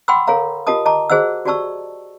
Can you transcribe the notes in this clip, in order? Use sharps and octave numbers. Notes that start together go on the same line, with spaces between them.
F#5 G5 B5 C6 D6 E6
A4 A#4 C#5 F5 A#5
F4 G4 A#4 D#5 A5 D#6
D#5 A5 A#5 D6
F#4 G#4 C5 D#5 F#5 E6
F#4 G4 D5 A5 C#6 E6